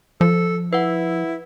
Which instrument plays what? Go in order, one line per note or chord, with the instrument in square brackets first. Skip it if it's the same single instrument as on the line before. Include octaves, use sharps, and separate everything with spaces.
[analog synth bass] F3 [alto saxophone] A4
[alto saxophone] E4 [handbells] B4 F#5